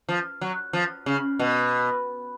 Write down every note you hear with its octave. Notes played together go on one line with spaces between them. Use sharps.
F3
F#3
F3
C#3
B2